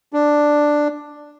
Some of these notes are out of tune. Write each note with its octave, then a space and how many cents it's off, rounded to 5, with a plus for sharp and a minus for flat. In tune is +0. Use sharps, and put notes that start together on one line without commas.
D4 +5